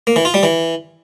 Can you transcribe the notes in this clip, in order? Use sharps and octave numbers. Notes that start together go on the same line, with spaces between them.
A#3
E3
F4
G3
E3